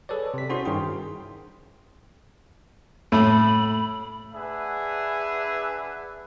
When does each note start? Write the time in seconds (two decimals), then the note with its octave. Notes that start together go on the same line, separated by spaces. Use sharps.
0.09 G#4 A4 B4 C#5 D5
0.34 C3 B6
0.50 C#4 E4 F#4 G#4 C5 C6
0.65 G2 D#3 E4 G#4 G5 C6
3.12 A2 B5
4.34 D4 G#4 B4 E5 F#5